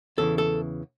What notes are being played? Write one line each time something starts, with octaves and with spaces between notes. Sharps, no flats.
E2 C#3 E3 A4
A4